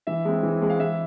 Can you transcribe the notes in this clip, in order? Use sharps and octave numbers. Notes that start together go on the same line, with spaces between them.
E3 E5
G#3 C4
E3
G#3 C4
F5
E3 E5